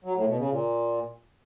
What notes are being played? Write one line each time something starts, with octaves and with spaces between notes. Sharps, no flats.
F#3
A2
B2
C#3
A#2